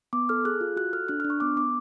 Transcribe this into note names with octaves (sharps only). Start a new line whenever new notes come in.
B3 D6
A4 F6
G#4 F#6
F4
F#4 F#6
A4 F6
D4 F#6
F6
D4
C#6
B3 D6
B3 D6